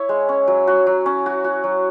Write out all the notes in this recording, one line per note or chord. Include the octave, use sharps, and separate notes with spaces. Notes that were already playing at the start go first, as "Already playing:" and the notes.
Already playing: E4 C#5
G#3
C#4
F#3
F#4
F#3
C#4
F#4
F#4
F#3